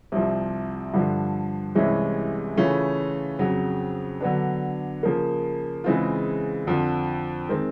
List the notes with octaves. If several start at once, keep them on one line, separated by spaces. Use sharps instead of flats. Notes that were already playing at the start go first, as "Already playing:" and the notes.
C2 C3 F3
G2 D3 F3
C2 C3 E3 G#3 C#4
C#3 E3 A3 C#4 F4
F2 C#3 F#3
D3 F#3 B3 D4
C#3 F3 A#3
C#3 E3 G#3 C4 F4
F2 D3 F3
D#3 G#3 C4